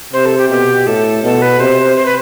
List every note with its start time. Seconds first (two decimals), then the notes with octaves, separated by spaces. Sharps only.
0.13 C3 C5
0.26 A4
0.38 G4
0.50 B2 G4
0.86 A2 A4
1.23 B2 A4
1.42 B4
1.60 C3 C5
1.96 C5
2.06 B4